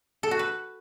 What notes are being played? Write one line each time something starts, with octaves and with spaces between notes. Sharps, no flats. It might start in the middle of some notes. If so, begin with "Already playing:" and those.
A4
F#4
B4